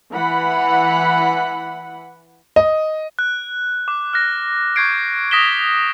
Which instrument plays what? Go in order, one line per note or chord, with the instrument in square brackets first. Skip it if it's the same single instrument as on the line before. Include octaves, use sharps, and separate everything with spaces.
[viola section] E3 F#5 B5
[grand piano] D#5
[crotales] F#6
D6
F6 F#6 A#6
C#6 G6 G#6 C7 D7
D#6 A#6 B6 E7 G7